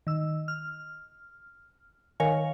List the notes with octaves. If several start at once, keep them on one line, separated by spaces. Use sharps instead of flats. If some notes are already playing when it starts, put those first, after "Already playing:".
D#3 E6
F6
D#3 A#4 C#5 F5 G#5